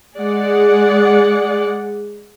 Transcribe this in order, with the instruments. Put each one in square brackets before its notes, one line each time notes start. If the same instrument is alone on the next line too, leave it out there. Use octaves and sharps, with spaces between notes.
[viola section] G#3 G#4 D5 F#5